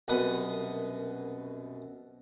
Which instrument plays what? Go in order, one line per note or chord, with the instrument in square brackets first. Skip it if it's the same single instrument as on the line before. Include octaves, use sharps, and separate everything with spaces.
[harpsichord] C2 F#2 B2 B4 D#6